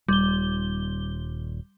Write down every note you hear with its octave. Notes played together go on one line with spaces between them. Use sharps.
D#1 G3 G7